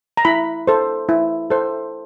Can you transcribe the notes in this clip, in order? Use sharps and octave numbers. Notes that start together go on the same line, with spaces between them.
A#5
E4 B5
A4 C5
E4
A4 C5